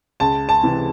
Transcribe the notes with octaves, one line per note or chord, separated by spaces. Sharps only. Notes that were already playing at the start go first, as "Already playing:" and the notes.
C#2 A5
A5
C3 E3